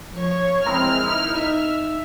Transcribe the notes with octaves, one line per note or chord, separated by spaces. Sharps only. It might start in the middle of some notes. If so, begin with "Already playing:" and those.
F3 C#5
G#3 C4 E4 A#5 F6
D#4 E4
D#4 E5